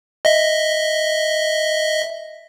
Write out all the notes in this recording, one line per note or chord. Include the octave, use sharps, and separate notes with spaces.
D#5 E5